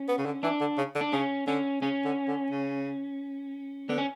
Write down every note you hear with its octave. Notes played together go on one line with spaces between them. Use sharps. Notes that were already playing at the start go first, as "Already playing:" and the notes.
Already playing: C#4
B3
C#3
D3
E3 D4
D3
C#3
D3
D4
C#3 C#4
D3 C#4
C#3 C#4
D3
D3
C#3
D3 B3
C#4